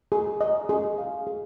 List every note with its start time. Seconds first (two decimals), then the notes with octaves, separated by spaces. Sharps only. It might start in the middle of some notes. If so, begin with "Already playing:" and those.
0.12 G#4
0.41 D#5
0.69 G#4
0.98 F5
1.27 G#4